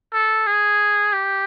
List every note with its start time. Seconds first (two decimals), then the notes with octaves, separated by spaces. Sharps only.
0.13 A4
0.47 G#4
1.13 G4